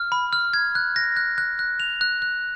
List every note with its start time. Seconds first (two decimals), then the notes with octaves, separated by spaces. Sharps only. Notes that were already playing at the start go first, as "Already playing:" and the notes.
Already playing: F6
0.12 B5
0.33 F6
0.54 G#6
0.75 F#6
0.96 A#6
1.17 F#6
1.38 F#6
1.59 F#6
1.80 F7
2.01 F#6
2.22 F#6